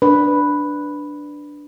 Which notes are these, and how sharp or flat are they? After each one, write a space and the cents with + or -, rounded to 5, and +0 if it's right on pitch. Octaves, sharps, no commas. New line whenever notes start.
D4 +0 B4 +0